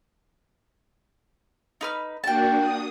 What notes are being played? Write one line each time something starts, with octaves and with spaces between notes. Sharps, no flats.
D#4 B4 F6
A#3 D4 F#4 G5 A5
D#6